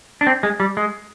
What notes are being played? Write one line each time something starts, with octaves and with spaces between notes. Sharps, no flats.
D4
C4
G#3
G3
G#3